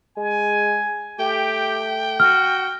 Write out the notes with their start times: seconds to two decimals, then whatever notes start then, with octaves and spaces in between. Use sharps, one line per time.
0.17 G#3 G#5
1.19 A3 G4 G5
2.20 F#4 F6